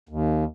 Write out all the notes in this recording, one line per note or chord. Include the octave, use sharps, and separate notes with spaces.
D#2